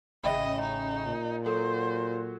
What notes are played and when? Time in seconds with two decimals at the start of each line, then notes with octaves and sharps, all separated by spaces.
0.24 A1 C#3 D#5 E5 G5 B5 E7
0.62 D#4
1.06 A#2
1.46 F#3 A4 C5